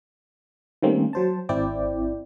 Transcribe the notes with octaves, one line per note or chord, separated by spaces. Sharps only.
D#3 G3 A3 A#3 C4 C#4
F#3 C5 A5
G#1 C4 E4 D5 G5